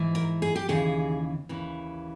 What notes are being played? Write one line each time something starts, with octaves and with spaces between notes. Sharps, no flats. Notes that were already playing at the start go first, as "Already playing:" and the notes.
Already playing: G#2 E3
A#4
G#4
G4
D#2 C#3 E3 G#4
D#2 C#3 E3